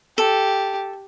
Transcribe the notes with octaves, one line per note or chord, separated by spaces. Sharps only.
G4 A4